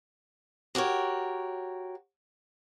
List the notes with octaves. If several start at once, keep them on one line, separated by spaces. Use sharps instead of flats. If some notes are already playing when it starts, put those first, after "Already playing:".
F#4 G4 A#4 C#5